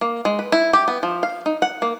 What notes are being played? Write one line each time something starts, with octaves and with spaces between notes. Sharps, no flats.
A#3
G#3
B4
E4
G4
B3
F3
F5
D#4
F#5
A#3